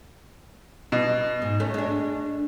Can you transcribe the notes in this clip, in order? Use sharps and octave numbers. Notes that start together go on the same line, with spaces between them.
B2
G#2
A3 C#4
G#3 D4